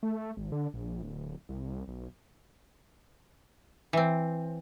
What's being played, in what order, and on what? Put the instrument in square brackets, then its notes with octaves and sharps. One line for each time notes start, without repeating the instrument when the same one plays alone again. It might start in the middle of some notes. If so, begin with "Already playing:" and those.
[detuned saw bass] A3
G#1
D3
A#1
D1
C2
B1
[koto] E3 C4